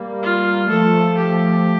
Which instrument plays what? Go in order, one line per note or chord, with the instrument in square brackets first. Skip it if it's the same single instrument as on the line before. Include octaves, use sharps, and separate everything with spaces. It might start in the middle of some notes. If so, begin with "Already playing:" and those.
Already playing: [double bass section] G3 A#3
[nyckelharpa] F4
[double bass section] F3 A3 [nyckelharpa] A4
[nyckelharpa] G4